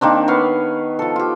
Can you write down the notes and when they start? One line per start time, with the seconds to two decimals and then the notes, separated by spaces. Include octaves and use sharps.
0.01 D#3 A#3 C4 D4
0.28 B3 C#5 F5 B5
0.99 F3 A4
1.16 F4 G4